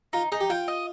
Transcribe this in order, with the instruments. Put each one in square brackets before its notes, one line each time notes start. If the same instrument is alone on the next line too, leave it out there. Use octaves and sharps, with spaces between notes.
[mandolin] D#4 [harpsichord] F4
[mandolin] D#4 [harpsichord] G#4
[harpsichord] G4
[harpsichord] F4 [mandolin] G5
[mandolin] D#5